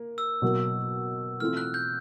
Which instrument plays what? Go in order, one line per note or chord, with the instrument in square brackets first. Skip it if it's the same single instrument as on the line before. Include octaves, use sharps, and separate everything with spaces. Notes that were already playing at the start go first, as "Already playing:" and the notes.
Already playing: [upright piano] A#3
[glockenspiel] E6
[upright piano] B2 F#3 A#3
[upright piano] E3 A3 C4 F4 [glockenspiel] F6
[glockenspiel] F#6
G6